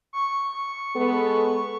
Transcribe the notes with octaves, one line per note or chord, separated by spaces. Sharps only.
C#6
G#3 B3 A4